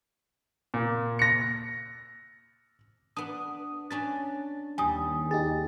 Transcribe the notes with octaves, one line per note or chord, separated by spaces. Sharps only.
A#2
A#6 C#7
B3 D4 D#6
C#4 D4 B4 A6
D#2 G3 G#5 D#6
D#4 G4 G#4 A6